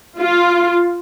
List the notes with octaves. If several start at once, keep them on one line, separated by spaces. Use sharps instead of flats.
F4